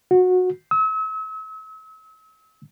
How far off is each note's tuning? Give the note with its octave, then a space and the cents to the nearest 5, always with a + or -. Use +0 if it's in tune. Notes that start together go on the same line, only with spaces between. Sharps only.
F#4 -20
E6 -40